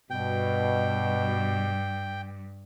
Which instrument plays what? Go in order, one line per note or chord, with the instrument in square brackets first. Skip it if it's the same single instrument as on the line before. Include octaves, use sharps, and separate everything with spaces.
[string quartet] G2 [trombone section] B2 [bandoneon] G5